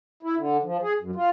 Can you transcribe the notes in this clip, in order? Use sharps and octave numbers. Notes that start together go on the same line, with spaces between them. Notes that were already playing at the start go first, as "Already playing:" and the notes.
E4
D3
F3
G#4
F#2
F4